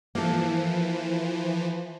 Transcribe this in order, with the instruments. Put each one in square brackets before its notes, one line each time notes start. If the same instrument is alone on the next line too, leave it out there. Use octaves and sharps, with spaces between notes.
[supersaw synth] E3 F3 [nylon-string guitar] A#3 A4